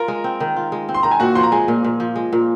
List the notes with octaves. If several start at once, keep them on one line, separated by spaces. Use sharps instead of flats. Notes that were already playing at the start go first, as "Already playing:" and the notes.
Already playing: F4 A#4 A#5
G#3
C4
D#3
F4
G#3
C4
C6
D#3 A#5
G#5
A#2 F#4 F#5
F3 C6
A#5
G#3 G#4 G#5
A#2
A#2
F3
G#3
A#2